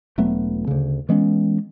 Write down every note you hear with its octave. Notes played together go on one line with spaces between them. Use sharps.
E1 F#3 A3 B3
D2 C#3
E3 G#3 B3 C#4